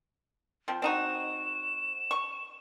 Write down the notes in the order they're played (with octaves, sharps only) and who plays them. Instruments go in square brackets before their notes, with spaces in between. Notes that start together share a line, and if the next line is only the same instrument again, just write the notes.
[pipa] F3 C4
[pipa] C4 D#4 F#4 [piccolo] E7
[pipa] C#6